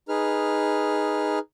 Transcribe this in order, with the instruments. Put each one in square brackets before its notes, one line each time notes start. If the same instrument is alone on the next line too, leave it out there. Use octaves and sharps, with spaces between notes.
[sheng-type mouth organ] D#4 G#4 B4 F6